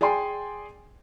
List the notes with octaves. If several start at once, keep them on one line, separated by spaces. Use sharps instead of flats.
G#4 D5 G5 G#5 C6